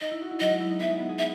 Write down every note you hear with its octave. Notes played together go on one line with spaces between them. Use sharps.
D#4 D#5
E4
F#4
E4
F#3 D#5
G#3
E4
D#4
B3 E5
G#3
B3
G#4
E5